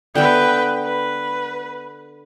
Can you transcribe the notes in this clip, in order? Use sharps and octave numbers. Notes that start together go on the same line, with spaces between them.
D3 B3 B4 E5 G5
B4